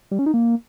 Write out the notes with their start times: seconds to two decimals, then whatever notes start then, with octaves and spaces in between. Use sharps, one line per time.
0.11 G3
0.19 C#4
0.26 D#4
0.34 A#3